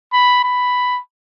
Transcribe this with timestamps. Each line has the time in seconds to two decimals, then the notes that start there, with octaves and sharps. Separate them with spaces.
0.13 B5
0.44 B5